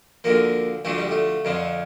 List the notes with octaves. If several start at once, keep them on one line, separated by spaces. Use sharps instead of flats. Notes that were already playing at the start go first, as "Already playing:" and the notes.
D2 D3 F3 A#3
D2 D3 F3 A3
G3
A3
F2 D3 F3